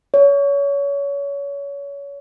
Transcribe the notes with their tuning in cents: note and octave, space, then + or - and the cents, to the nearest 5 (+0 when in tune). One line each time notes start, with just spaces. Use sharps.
C#5 +25